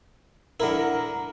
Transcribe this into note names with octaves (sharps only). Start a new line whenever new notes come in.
D3 E4 A#4